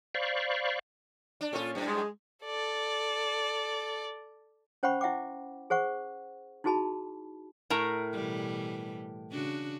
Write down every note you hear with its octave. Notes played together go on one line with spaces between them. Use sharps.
C5 D5 F5 B5 C#6
D4
A#2 C#4 F4 A4
F#2 A2
G#3
A4 D5
C#4 C5 F#5 G5 B5 C#6
E4 E5 F#5 G5 D6
G#4 C5 F#5 C#6
D#4 E4 F#4 G#4 A5 B5
A2 A#4 A#5
B2 E3 G3
C#3 D4 F#4